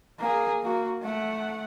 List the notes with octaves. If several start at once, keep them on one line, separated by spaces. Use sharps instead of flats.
A#3 G#4
A#3 F#4
A3 F#5